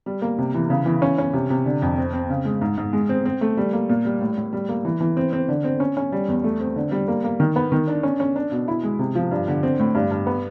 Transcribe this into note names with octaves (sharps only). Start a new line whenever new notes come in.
G3
A#3
C3
E3
C#3
E3
C#4
C#4
C3
C3
D3
F2
C4
C4
C#3
G#3
G#2
G#2
G#3
C4
C4
A3
G3
A#3
A#2
G3
A2
A2
G3
A#3
E3
E3
C4
C4
D3
C4
C#4
C#4
G3
E2
A3
C4
D3
G3
A#3
A#3
D#3
B3
D#3
D4
C#4
C#4
D4
B2
E4
G#3
C3
F3
G2
D3
C4
A2
G2
G2
B3